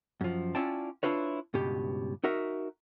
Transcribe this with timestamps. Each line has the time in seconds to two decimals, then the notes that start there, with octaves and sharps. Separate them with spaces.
0.21 F#2 F3
0.55 C#4 E4 F4 D5 G5 A5
1.03 D4 E4 F4 B4 C#5
1.54 C#2 G2 B2 G4
2.24 D#4 F#4 A#4 E5